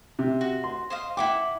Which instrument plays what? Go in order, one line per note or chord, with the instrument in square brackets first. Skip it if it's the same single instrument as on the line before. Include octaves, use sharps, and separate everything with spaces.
[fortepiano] C3
[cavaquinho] F#4
[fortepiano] C6
[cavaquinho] C5 D#5 F5
[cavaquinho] E4 F#5 D6 [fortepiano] G5